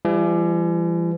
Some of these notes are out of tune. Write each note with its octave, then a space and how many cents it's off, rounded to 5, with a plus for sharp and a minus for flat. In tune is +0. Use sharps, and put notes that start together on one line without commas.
E3 +45 G3 +25